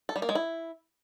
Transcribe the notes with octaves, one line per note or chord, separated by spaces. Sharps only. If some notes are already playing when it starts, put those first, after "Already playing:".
A4
G3
A#3
G#3
E4